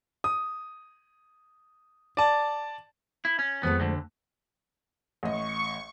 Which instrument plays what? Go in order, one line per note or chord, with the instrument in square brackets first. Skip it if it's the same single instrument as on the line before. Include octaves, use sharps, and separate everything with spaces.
[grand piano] D#6
D5 A5
[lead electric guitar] E4
C#4
[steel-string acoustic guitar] F2 G#3 A3 [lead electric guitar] B3
[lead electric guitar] D2 D3
[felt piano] A1 D#5 [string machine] C#6